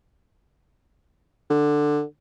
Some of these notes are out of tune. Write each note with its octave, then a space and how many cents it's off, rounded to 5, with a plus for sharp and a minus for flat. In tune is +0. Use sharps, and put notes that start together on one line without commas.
D3 +10